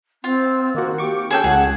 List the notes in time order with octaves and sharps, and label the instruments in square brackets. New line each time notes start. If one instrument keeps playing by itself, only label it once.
[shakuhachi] C4 [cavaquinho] F4
[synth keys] D#3 F#4 [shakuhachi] A#3
[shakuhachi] G4 [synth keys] C#6 D6
[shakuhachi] C#4 [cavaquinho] G#4 A4 G5
[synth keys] C#2 [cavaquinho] G#4 [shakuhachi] F#5